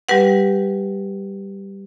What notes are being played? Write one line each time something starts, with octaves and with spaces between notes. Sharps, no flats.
G3 G4 B4 F#5